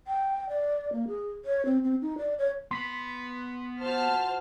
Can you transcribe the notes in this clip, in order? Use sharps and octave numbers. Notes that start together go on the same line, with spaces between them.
G5
D5
A#3
G#4
C#5
C4
C4
D#4
D5
C#5
B3 B5 C6 B6
F3 F#4 C5 A5 F6